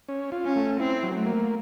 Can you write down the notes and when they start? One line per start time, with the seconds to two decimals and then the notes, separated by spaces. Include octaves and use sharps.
0.09 C#4
0.32 F4
0.44 C#4
0.56 A3
0.79 C4 E4
1.03 F#3
1.15 A3
1.26 A#3